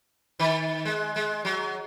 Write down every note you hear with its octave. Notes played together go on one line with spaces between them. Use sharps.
D#3
G#3
G#3
F#3